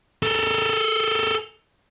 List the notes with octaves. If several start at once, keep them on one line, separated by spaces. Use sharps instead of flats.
A4 A#4